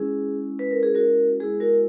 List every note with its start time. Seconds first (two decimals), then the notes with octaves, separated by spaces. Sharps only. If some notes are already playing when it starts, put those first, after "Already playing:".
Already playing: G#3 C#4 E4 G#4
0.59 B4
0.71 A#4
0.83 G#4
0.95 F#4 A#4
1.40 G#3 B3 E4 G#4
1.60 F#4 A#4